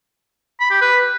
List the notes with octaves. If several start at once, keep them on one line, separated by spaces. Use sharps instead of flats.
B5
G4
B4